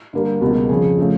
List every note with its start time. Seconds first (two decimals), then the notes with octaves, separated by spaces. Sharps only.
0.13 G2 D3 G3 A#3
0.41 C#2 B2 G3 A#3
0.69 F2 C#3 F3 G#4
0.99 C#3 F3 A3